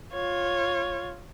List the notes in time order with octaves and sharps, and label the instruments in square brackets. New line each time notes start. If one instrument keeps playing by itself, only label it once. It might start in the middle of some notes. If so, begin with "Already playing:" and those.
[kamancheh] F4 C#5